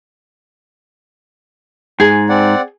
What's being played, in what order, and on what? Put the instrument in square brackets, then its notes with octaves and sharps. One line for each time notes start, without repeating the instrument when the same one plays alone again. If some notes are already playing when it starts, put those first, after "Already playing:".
[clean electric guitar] G#2 [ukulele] G#4
[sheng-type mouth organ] C4 D5 F#5